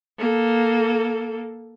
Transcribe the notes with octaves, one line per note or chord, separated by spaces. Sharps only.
A#3 A4